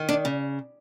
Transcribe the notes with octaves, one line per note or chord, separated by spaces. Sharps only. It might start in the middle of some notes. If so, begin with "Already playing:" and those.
Already playing: D#3
D4
C#3